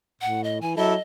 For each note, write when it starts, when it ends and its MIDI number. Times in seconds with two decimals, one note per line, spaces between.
0.21 0.60 45
0.21 0.44 78
0.44 0.58 75
0.62 0.73 52
0.62 0.73 80
0.77 0.96 54
0.77 0.94 64
0.77 0.94 69
0.77 1.02 75